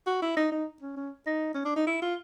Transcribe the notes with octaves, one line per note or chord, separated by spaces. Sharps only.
F#4
E4
D#4
D#4
C#4
C#4
D#4
C#4
D4
D#4
E4
F4